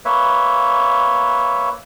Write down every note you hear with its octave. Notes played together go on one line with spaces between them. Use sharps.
A#3 B4 C#5 E5